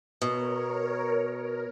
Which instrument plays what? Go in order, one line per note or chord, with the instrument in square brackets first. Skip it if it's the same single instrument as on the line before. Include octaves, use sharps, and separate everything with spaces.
[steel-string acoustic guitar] B2 [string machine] A#4 C#5
[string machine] A#4